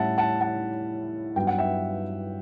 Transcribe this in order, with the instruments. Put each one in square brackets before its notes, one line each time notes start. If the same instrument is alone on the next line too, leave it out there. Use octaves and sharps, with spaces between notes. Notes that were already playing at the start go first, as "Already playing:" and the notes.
Already playing: [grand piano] A2 G3 C#4 E5 F#5 A5
F#5 A5
F#5 A5
G2 F#3 B3 E4 G5
F#5
E5 G5